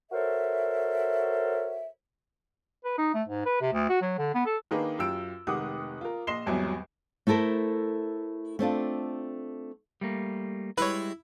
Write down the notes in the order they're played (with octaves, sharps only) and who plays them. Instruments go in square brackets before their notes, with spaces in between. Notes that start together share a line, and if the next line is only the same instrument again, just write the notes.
[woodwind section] F#4 A4 A#4 C5 C#5 E5
[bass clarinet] B4
D#4
A3
G#2
B4
C3
D2
F#4
F#3
D3
B3
A4
[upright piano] D#3 A#3 D4 D#4 G#4 B4
F#2 F4 G4 E6 D7
F1 D#3 G#3 F#5 D6 D#6
F4 A#4
A#1 D#5 C6 C7 E7 G7
G#1 E2 F#3 G3 E5 G#5
[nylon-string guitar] A3 E4 A4 A#4 C5
A3 C4 D4 F4
[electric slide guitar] G3 A3 A#3
[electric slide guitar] G3 G#3 [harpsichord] E4 [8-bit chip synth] B4 C#5